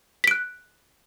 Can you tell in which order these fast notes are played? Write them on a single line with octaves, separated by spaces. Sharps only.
B6 D7 F#6